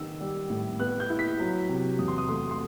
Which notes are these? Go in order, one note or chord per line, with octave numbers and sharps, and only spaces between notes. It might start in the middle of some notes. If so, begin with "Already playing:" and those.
Already playing: D#3 E6
G3
A2
B3 F#6
G6
E4
B6
F#3
C3
E2 D#6
C6
D#6
A3 C6
C6